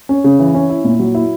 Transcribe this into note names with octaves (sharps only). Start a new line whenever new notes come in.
C#4
C#3
E3
C#4
E4
A#2
F#3
E4